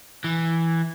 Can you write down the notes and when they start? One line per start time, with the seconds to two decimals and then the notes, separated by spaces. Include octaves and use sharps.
0.24 E3